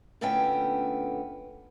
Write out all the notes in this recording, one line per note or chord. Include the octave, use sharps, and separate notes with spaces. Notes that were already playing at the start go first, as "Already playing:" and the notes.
A#2 D3 A3 B3 C#4 G5